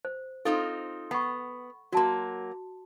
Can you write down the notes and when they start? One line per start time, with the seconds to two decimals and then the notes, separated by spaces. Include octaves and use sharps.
0.05 C5
0.45 C4 D#4 F4 A4
1.11 B3 F#5 C#6
1.92 F#3 A#3 F#4 A5 C6